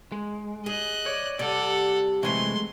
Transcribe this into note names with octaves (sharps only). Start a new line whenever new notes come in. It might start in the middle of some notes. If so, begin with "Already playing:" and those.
G#3
G#4 D#5 F#6
C#5 D5
C3 G3 A4 D5 F#5
C3 E3 F#3 G#3 A3 C6